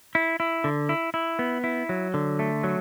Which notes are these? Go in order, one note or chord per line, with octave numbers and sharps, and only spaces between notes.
E4
E4
D3
E4
E4
B3
E4
F#3
D3
A3
F#3